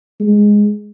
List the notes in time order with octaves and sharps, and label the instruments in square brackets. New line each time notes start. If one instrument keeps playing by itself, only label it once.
[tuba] G#3